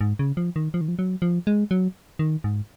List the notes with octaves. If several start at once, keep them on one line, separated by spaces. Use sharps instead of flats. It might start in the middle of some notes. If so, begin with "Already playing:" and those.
G#2
C#3
F3
D#3
F3
D#3
F3
F#3
F3
G#3
F#3
D#3
G#2